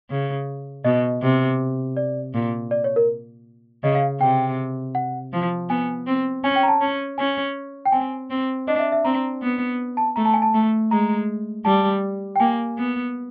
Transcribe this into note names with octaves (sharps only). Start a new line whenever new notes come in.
C#3
B2 D#5
C3
D5
A#2
D5
C#5
A#4
C#3 D#5
F5
C3 G5
F#5
F3
B3 G#5
C4
C#4 G#5
G5
A#5
A5
C#4
C#4 G#5
G5
C4 G#5
C4
D4 D#5
E5
E5
C4 A#5
B3
A5
A3 A#5
A5
G#5
A5
A3
G#3 A#5
G3 A5
G5
A#3 G#5
B3